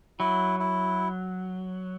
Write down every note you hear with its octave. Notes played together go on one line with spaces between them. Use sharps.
F#3 E4
E4